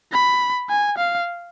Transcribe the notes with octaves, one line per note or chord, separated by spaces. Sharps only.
B5
G#5
F5